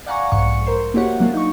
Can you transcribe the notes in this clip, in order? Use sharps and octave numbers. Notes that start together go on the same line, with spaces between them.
D5 F5 F#5 G#5 A#5 C#6
B1 F2 G#2 C#6 C#7
A#4 C5 C6
A#3 E4 F#4 G4 C#5 F#5
F#3 A#3 D4 F4
D#4 C#6